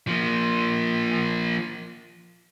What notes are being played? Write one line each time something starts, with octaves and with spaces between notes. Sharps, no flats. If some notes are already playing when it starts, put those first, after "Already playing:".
F3 A#3